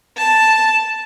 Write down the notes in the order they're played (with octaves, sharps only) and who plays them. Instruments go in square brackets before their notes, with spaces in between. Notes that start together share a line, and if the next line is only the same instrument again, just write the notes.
[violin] A5